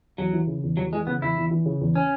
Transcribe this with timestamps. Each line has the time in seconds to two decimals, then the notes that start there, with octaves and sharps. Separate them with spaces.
0.18 E2 F#3
0.33 E3
0.47 C#3
0.63 E2
0.77 E2 F#3
0.93 E3 G#3
1.07 C#3 B3
1.22 E2 E4
1.37 E2
1.51 E3
1.66 C#3
1.81 E2
1.96 C#4